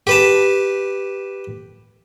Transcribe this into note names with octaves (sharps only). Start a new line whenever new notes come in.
G4 B4 A5